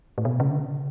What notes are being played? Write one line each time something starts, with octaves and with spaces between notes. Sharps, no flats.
A2
B2
C#3
D3
C#3